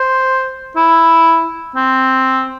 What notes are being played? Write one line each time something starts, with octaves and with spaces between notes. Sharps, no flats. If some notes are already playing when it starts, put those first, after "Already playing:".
Already playing: C5
E4
C4